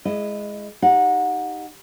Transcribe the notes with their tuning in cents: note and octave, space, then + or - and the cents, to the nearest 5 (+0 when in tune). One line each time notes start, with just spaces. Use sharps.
G#3 +5 E4 +10 D#5 -20
D#4 +0 G4 +0 F#5 -25